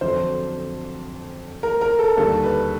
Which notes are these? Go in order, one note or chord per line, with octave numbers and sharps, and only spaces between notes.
F2 D3 F#3 C5
A#4
A#4
A4
D#2 D3 G3 A4
B4